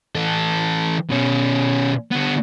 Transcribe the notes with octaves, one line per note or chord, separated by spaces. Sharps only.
E3 A4
B2 C#4
D3 B3